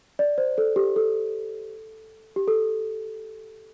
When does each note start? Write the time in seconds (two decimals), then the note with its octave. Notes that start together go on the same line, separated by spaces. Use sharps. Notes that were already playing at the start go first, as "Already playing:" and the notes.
0.19 D5
0.38 C5
0.58 A4
0.76 G4
0.96 A4
2.36 G4
2.48 A4